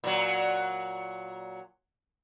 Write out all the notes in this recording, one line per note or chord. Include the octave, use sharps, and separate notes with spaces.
A#2 F#3